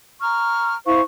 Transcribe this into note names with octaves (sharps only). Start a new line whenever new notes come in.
A#5 C#6 F6
E4 C5 F5 C#6